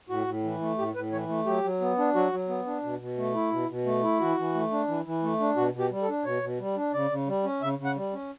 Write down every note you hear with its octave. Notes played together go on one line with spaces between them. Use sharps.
A2 F#4
A2
E3
A3
A2 G4
A2 B4
E3 C#5
A3
F#3 G4
F#3
B3
D4
F#3 F#4
F#3
B3
D4
B2
B2
A3
E4
B2
B2
A3
E4
E3 F#4
E3
A3
D4
E3
E3
A3
D4
B2 F#4
B2
G4
G3
A4
D4
B2 C#5
B2
G3
D4
C#3 D5
C#3
G3
C#4
C#3 E5
C#3
F#5
G3
C#4